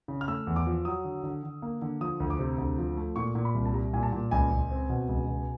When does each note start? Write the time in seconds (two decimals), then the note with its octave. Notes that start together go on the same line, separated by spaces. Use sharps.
0.08 C#3
0.21 F6
0.28 A3 E6
0.47 E2
0.56 D6
0.66 F3
0.85 F#3 D#6
1.04 D3
1.23 D3
1.43 D3
1.62 A#3
1.82 D3
2.01 F3 D#6
2.20 D2
2.30 D6
2.39 C3
2.58 D2
2.78 F3
2.97 A3
3.16 A#2 C#6
3.35 A#2
3.45 B5
3.55 C2
3.66 A5
3.73 G3 A#5
3.93 A#2 G#5
4.03 A5
4.13 A#2
4.31 C#2 G#5
4.51 C#2
4.71 C4
4.89 B2
5.09 C#2
5.27 B2